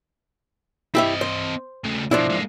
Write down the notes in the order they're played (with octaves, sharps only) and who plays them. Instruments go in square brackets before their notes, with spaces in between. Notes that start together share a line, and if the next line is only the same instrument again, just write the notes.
[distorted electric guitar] C4 D#5 [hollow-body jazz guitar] E4 G4 E5
[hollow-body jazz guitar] C5
[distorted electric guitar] C#3 A3
[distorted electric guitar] B2 A#3 [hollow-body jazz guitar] F3 D4 E4
[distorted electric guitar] G#3 A#3